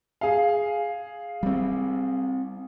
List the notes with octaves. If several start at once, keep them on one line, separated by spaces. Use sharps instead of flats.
G#4 F5
G3 C4